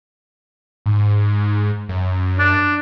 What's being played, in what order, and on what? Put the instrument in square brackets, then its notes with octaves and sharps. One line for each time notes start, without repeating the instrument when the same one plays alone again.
[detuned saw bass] G#2
F#2
[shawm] D4